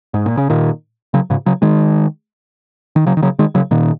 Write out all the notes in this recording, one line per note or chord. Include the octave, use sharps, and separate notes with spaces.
G#2
A#2
C#3
A#2 D#3
C#3 F#3
G#2 C#3
C#3 F#3
D#3 G#3
D#3
C#3 F#3
D#3
C#3 F#3
D#3 G#3
C#3 F#3
A#2 D#3